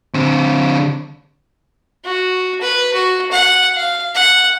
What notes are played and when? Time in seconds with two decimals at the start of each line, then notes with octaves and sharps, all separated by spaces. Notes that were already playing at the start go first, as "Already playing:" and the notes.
0.14 D3 C4
2.05 F#4
2.61 B4
2.94 F#4
3.31 F#5
3.76 F5
4.15 F#5